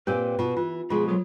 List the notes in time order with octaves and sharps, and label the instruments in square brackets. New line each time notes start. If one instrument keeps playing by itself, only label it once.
[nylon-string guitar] A#2 C4 G4 [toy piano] D4 A#4 C#5 [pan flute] B4
[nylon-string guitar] B2 [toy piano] F4
[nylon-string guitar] E3 [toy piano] F4
[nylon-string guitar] B2 F3 G#3 [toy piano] F4 [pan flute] G#4
[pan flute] F#3 [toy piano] A4